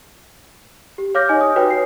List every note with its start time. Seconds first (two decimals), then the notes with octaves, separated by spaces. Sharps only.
0.98 G4
1.15 C#5 F5 D6 F6 G6 A#6
1.29 D#4 D#5 G#5
1.41 D#6
1.56 F#4 B4 C#5 G5
1.70 C7